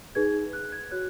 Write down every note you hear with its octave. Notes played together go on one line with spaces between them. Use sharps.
D#4 G#4 B4 G#6
F#6
G#6
F#4 C#5 F#6